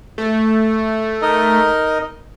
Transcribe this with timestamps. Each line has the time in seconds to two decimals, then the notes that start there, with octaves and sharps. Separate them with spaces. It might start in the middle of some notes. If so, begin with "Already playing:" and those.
0.18 A3
1.22 D#4 A#4 D#5